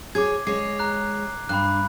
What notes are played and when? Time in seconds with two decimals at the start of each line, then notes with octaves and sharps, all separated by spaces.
0.15 G#4 C#5 D6 G#6
0.47 G#3 C#5 D6 C7
0.79 A#5 F#6
1.49 G2 B5 F#6